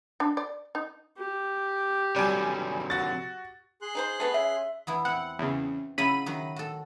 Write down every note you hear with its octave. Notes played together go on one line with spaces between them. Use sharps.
D4
D5
D#4
G4
C3 F#3 G3 G#5
F#4 A6
G#4 C6 F#6
D#4 B4 C5
A3 B3 B4
C#3 E5
E2 B3 E4
C4 E4 F#5
E2 C#3
C#3 F#3 E4 F4 B5 D#7
D#3 F#3 F#4
F#4 A4